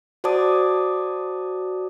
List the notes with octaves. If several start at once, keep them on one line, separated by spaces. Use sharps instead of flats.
F#4 C5 D5 A5 D6 D#6